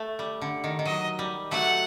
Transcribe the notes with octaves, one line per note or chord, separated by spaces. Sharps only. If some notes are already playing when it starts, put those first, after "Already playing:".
Already playing: A3
G3
D3
D#3
D#3
F#3 D#5
G3
F#3 A3 F#5